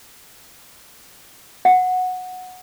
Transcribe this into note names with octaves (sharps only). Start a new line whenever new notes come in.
F#5